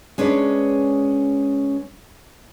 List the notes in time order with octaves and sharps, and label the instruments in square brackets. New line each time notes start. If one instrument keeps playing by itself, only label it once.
[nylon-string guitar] G#3 C#4 D4 B4 C#5